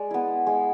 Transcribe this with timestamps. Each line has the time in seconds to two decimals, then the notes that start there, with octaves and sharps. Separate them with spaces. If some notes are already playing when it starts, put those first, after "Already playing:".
Already playing: G#3 D5
0.11 B3 E4
0.47 G#3